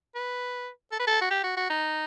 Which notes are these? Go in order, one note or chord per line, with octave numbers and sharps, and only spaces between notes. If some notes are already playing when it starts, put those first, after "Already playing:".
B4
A4
B4
A4
F#4
G4
F#4
F#4
D#4